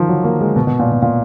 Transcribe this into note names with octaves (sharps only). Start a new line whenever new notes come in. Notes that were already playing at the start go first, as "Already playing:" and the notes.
Already playing: D#3 F3
F#3
A#3
G#3
B2
B2
A#2
B2
A#2